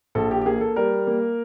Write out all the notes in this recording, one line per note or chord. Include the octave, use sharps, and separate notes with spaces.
A#1 A4
G4
G4
A#3 G#4
A4
G3 A#4
A#3